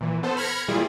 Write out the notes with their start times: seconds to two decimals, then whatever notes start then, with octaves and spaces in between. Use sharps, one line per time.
0.01 A#2 E3
0.23 B3 A4 C5
0.37 B5 F6 G#6 A#6 C#7
0.68 A#2 E3 G3 E4 F4 G#4